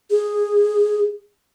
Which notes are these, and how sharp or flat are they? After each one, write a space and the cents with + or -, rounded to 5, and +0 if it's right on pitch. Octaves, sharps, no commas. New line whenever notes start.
G#4 -10